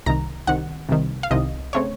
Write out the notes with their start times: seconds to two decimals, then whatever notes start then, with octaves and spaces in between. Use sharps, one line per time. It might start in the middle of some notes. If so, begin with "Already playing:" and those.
0.06 C2 C3 D#3 A#5
0.47 C2 C3 D#3 F#5
0.89 C2 C3 D#3
1.23 F5
1.31 C2 C3 D#3 D#5
1.73 C#3 A3 C4 C#5